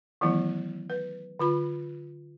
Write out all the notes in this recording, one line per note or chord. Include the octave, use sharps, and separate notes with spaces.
D#3 E3 F#3 A3 B3 E4
B4
D3 F4 B5